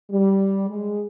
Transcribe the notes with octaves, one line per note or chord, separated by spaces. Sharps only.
G3
G#3